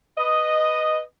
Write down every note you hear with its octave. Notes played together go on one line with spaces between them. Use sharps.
B4 D#5